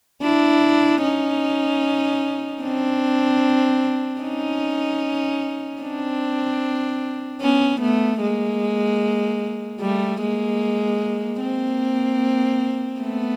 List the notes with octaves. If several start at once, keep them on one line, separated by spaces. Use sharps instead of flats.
D4 E4
C#4 D#4
C4 D4
C#4 D#4
C4 D4
B3 C#4
A3 B3
G#3 A#3
G3 A3
G#3 A#3
A#3 C4
A3 B3